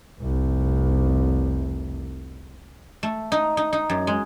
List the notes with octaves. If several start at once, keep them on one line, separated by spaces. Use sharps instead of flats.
F1 C2
A3
D#4
D#4
D#4
F#2
G#3